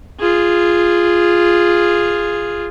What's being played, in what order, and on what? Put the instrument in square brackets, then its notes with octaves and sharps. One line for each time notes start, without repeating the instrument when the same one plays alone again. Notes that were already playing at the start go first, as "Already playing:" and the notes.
[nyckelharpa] F4 G#4